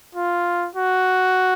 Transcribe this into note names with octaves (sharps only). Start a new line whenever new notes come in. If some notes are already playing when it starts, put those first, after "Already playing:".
F4
F#4